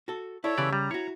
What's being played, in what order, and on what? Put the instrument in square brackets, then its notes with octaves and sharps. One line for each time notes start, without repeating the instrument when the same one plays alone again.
[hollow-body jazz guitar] F#4 A4
[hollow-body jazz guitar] E4 D5 [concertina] A4 C#5 E5
[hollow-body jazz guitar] C#3 G4 [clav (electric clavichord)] E3 D5
[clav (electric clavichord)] G3 [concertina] A#5
[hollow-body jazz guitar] E4 F#4 [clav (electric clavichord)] C#5